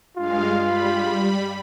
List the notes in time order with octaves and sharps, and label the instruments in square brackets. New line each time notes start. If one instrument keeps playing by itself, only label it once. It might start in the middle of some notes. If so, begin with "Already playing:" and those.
[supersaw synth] G2 G#3 F5 [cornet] F4
[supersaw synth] G3 B5